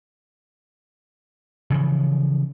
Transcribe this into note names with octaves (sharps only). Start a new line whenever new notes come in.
C#3 E3 F3